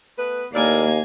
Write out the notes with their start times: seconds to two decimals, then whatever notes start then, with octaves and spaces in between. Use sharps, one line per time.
0.18 A3 B3 B4
0.54 D#2 A2 A#3 A#4 D5 G#5